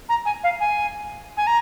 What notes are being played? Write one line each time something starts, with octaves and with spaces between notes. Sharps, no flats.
A#5
G#5
F5
G#5
G#5
A#5